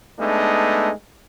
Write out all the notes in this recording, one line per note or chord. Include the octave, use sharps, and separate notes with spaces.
G#3 A3 B3 D4 D#4